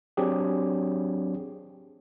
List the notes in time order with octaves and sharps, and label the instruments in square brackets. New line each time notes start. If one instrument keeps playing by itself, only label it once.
[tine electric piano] F#3 C4 D4 G4 G#4